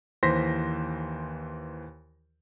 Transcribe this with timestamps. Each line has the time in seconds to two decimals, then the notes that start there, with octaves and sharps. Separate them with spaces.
0.23 D#2 E3 C5 C6 A#6 B6